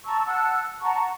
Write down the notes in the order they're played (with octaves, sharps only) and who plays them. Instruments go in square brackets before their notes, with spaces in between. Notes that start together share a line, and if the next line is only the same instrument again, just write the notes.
[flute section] A5 A#5 C#6 E6
F#5 A5 E6 F#6
F#5 A5 A#5 C#6